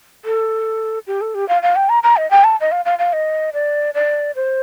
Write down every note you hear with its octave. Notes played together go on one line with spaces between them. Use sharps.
A4
G4
A4
G4
F5
F5
G5
A#5
A#5
D#5
G5
A5
D#5
F5
F5
F5
D#5
D5
D5
C5